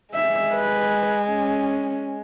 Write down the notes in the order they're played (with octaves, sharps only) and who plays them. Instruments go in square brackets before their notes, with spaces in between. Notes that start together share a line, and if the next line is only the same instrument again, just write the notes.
[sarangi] G#3 [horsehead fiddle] E5
[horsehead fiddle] B4
C#4